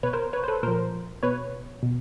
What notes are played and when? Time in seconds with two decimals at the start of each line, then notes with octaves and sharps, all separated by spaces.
0.03 B2 B4 C#5
0.13 A#4 C5
0.33 B4 C#5
0.44 C5
0.48 A4 B4
0.63 A#2 F3 A#4 C5
1.23 B2 B4 C#5
1.83 B2